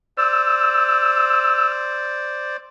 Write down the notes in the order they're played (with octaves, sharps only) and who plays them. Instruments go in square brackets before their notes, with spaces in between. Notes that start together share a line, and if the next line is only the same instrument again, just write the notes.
[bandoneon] C5 D5 [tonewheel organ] E6